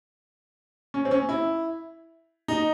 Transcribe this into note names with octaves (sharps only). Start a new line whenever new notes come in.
C#4
C4
C#4
E4
D#4